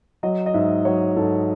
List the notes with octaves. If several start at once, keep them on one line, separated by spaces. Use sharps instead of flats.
F#3 D#5
D#5
G#2 E5
F#3 C#5
G#2 A4